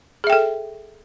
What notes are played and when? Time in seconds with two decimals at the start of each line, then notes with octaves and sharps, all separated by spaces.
0.24 G#4
0.27 E5
0.30 G5
0.33 A4